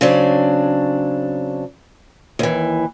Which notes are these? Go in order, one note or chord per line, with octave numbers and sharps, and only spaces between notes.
C#3 F#3 C4 D4
D#2 E3